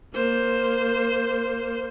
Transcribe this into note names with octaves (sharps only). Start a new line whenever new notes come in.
A#3 C5